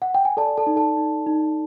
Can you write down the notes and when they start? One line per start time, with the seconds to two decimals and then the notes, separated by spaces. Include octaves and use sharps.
0.02 F#5
0.15 G5
0.25 G#5
0.37 A4 D5 A5
0.57 A4 A5
0.67 D#4
0.76 A4 A5
0.97 D#4
1.26 D#4